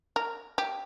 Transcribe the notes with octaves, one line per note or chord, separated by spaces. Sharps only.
A#4
G4